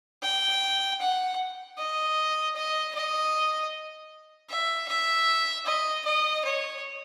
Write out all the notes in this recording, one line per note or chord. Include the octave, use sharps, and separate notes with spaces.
G5
F#5
D#5
D#5
D#5
E5
E5
D#5
D#5
C#5